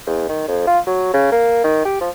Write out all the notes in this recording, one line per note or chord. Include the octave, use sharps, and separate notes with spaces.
E2
D#3
F2
F4
F#3
C#3
A#3
D#3
G4
F3